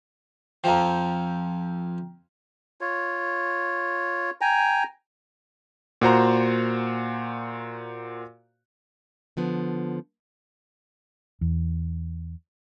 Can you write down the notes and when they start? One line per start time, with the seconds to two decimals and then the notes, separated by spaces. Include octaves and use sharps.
0.64 F2 F3 G5 A#5
2.81 F4 C#5
4.41 G5 G#5 A#5
6.01 A#2 F#4 C5 A#5
9.37 D3 F3 B3
11.41 E2